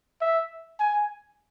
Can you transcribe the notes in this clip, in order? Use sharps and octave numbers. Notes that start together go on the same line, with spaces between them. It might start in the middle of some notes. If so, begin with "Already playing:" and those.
E5
G#5